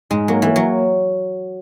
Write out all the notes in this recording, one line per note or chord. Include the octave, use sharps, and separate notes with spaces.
G#2 G#3
F#3 A#3
E3 A#3
F#3